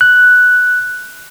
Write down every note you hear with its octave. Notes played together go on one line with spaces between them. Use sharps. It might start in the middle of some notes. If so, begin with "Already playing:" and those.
F#6